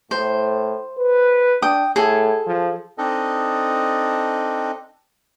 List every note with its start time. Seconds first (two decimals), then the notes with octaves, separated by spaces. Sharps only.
0.11 A2 C5
0.98 B4
1.62 D4 G5 D#6
1.96 A2 G#4 A4 G#5
2.47 F3
2.98 C4 D4 D#4 A4 D#5